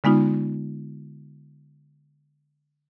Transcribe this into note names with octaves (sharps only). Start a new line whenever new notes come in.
D3 G#3 B3 D#4 F4